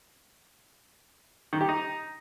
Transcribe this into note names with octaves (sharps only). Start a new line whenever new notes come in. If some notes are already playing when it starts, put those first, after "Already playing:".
D#3
G4
D#4